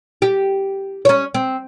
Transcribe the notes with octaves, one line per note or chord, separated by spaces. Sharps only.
G4
C#4 C#5
C4